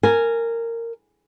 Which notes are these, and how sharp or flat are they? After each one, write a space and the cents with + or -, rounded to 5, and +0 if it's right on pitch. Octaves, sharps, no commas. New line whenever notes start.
A#4 -15 G#5 +0